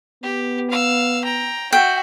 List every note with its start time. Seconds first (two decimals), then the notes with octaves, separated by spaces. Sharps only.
0.23 B3 G4
0.70 F5 E6
1.24 G5 A#5
1.73 F#4 E5 G5